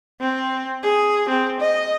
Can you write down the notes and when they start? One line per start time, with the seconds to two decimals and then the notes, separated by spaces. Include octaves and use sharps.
0.20 C4
0.83 G#4
1.29 C4
1.60 D#5